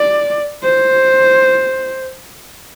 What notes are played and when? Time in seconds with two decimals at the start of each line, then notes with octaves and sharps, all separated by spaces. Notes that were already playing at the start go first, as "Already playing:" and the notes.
Already playing: D5
0.63 C5